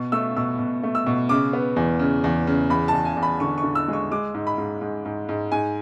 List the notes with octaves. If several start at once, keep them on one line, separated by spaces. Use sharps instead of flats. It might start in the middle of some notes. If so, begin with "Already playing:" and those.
Already playing: B2
A3 E6
B2 E6
B2
A3
E6
B2
C#3 D6
B3
E2
C#3
E2
C#3
E2 B5
A5
E2
G#5
E2
B5
D3 C#6
C#6
D3
E6
G#3 C#6
G#3 D6
G#2
B5
G#2
G#2
G#2
G#2
G#2 G#5